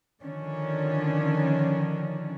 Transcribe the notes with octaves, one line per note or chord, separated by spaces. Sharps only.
D3 D#3 F3 C#4 D4